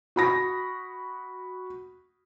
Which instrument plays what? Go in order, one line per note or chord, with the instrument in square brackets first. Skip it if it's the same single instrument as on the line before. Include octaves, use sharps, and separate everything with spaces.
[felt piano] F#4 B5 A#6